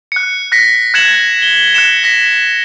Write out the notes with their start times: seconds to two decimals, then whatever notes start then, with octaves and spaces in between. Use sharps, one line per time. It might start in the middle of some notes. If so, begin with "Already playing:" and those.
0.12 F#6 C#7
0.52 F#6 A#6 B6 C#7
0.94 F#6 G#6 C#7 E7 F#7
1.42 G7
1.74 F#6 C#7 E7
2.04 A#6 B6